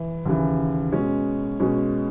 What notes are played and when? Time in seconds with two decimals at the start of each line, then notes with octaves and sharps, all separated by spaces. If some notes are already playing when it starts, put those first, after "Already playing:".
Already playing: E3
0.26 D#2 C#3 E3
0.93 B2 G#3 C#4
1.60 B2 G#3 C#4